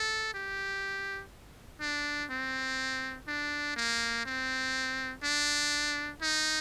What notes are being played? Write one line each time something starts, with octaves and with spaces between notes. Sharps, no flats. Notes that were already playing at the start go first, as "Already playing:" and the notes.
Already playing: A4
G4
D4
C4
D4
A#3
C4
D4
D#4